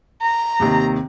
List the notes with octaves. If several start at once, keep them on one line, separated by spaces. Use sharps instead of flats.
A#5
D#2 C3 D#3